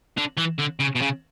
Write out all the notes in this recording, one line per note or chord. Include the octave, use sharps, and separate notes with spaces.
D3
E3
D3
C#3
B2
C#3